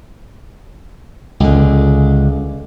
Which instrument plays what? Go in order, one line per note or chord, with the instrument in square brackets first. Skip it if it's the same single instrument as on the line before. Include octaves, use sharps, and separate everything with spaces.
[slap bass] C#2 D3